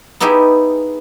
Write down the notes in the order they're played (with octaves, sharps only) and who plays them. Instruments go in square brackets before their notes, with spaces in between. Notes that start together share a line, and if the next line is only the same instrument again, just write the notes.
[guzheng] B3 D#4 E4 G4 G#4